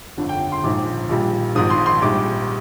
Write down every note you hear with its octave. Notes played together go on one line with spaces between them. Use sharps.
G1 F2 D3
G5
C6
A#1 G#2 F3 D6
A#1 A#2 G3
G#1 G#2 F3 D#6
C6
C6
A#1 G#2 G3 D6